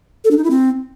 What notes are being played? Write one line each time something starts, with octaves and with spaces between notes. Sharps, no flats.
A4
D4
D#4
E4
C4